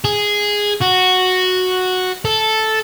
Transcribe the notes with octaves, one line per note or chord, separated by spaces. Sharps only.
G#4
F#4
A4